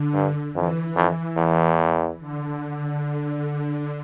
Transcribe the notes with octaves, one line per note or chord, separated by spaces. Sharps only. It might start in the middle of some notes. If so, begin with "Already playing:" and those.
Already playing: D3
G2
F2 E3
F2
E2
D3